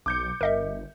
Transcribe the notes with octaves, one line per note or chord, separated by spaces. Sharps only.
B1 D6 G6 C#7
G1 A#4 D#5 E5